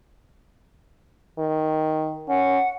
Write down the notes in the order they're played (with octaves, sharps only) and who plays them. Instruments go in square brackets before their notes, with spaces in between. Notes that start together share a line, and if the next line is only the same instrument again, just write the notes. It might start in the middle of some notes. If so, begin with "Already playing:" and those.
[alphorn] D#3
[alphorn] C#4 [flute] F#5